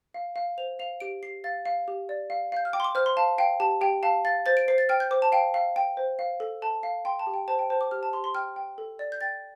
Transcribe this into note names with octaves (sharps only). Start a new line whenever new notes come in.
F5
F5
C5 F7
F5 F7
G4 D7
G4 C7
F5 A6
F5
G4
D5
F5
F5 G6
F6
G5 D6
C6
D6
C5 F6
C6
F5 A5
F5 G5
G4 A5
G4 G5
F5 A5
F5 A6
C5 A6
D7
C5 C7
A6
G5 F6
G6
C5 D6
A5
F5 G5
F5
G5
C5
F5
A4
A4 A5
F5
G5 C6
A5
G4
G5
C5 A5
G5
C5 A5
D6
G4 F6
A5
G4 C6
C6
G5 F6
G5
A4
D5
G6
G5 A6